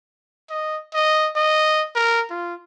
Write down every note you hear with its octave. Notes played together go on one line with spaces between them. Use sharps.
D#5
D#5
D#5
A#4
F4